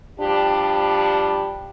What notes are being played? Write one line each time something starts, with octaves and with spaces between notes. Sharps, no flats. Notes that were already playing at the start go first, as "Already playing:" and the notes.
F3 G3 D4 G4